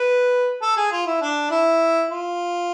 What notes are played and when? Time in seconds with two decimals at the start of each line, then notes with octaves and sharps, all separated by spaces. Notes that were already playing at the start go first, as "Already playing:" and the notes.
Already playing: B4
0.62 A4
0.77 G#4
0.92 F4
1.07 E4
1.21 D4
1.51 E4
2.11 F4